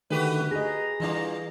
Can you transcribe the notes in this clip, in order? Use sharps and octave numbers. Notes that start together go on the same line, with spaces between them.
D3 D#3 A3 F#4 G4 B4
G#4 D#5 A#5
E3 G3 D4 F4